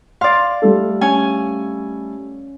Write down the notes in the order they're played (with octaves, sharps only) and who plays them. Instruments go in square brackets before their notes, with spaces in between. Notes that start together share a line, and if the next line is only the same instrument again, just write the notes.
[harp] D5 F5 [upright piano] C6
[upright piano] G3 A3 A4
[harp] C#4 G#5